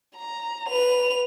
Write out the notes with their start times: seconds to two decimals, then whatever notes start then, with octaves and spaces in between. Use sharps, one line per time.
0.16 A#5
0.69 B4 F7